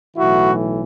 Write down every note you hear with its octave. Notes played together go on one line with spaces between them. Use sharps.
B1 A2 E3 E4 F#4